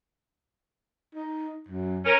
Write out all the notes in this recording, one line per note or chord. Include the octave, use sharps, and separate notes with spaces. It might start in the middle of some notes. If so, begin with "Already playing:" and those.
D#4
F#2
C#4 A#4